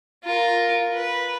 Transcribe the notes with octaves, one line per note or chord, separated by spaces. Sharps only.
F4 A#4
B4